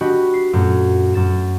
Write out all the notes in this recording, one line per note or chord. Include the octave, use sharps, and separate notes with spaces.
D4 F#4 G4 D#5 B5
B6 C7
F#2 A#2 A3
F#2 A6 E7